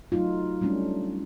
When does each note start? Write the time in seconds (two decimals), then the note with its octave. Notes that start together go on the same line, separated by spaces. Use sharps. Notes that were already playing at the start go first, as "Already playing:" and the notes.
0.12 F#3 A3 D#4 F4
0.61 G3 A3 C#4 D4